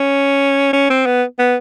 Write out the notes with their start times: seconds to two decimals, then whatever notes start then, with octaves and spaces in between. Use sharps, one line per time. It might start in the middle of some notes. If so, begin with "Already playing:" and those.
Already playing: C#4
0.73 C#4
0.90 C4
1.06 B3
1.39 B3